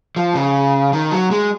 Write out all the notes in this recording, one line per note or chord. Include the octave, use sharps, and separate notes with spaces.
F3
C#3
D#3
F#3
G#3